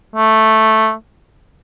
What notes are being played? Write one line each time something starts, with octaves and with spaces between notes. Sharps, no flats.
A3